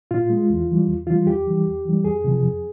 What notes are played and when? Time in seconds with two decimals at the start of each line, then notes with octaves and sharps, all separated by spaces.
0.11 A#2 F4
0.29 G#3
0.50 E2
0.68 E3 G3
0.88 E2
1.07 E3 G3 F4
1.26 E2 G4
1.47 E3 G3
1.66 E2
1.85 E3 G3
2.04 F2 G#4
2.24 C3 F3
2.43 F2